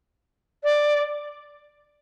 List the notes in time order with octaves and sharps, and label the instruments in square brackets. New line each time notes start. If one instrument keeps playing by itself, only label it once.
[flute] D5